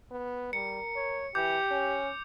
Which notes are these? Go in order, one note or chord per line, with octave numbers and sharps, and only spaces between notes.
B3
G3 A#4 C#7
C#5
E3 G4 D6 G6
C#4